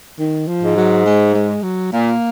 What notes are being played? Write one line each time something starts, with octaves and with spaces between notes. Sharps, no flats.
D#3
F3
G#2
F#3
G#3
G#3
F#3
A#2 A#3